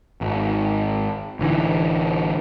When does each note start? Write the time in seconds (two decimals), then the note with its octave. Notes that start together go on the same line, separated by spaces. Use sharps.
0.21 G#1
1.39 A1 D3 E3